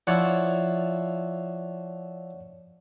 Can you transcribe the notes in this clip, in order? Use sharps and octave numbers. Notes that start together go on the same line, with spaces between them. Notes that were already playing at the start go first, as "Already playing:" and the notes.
F3 E4 C#5 D5 F#5